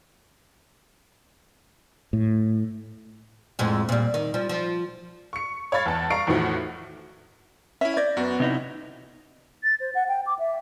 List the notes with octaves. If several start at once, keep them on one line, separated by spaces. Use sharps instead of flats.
A2
F2 A2 G#3
A#2 G3
D#3
F3 G3
F3
C#6 C#7
C#5 F5 B5 A6
E2 A5
F5 A#5 C#6 C7 D7
E2 A2 D#3 F3 F#4 F#5
C#4 E4 E5
D5 G6 G#6 A#6
F#2 B3 F#4
C3 C#4 D#4 E4 F#5
A6
C5
F#5
G5
D6
E5